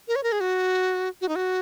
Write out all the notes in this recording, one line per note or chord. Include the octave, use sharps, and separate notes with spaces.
A#4
C#5
A#4
G#4
F#4
F#4
D#4
F#4